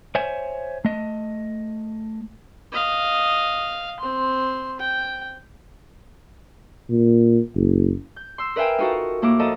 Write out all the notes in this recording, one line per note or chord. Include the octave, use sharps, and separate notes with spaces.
C5 C#5 E5 G#5
A3 D#5
D#5 F5
C4 C6
G5
A#2
F#1
G6
C6 E6
A#4 B4 E5 F5 G5 G#5
D#4 F4 F#4 A4 A#4
A2 A#3 E4 A#4 D6
F3 A4 D#5 A#5